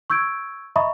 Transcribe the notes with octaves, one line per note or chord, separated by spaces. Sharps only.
C#6 E6 G6 G#6 D7
D#5 E5 A#5 B5 C#6 D#6